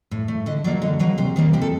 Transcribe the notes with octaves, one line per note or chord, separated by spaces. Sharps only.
A2
A3
D3 D#5
F#3 A#3 D5
D3 D#5
F#3 A#3 A#4
C3 C5
D#3 G3 A#3
C3 G4
A4